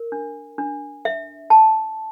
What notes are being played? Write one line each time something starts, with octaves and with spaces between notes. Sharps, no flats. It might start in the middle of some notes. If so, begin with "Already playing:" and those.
Already playing: A#4
D4
D4
E5
A5